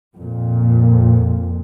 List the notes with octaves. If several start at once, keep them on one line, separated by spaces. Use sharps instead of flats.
F2 A#2